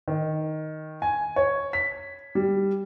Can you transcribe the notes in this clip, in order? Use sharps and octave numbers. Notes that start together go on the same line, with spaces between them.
D#3
G#5
C#5
B6
G3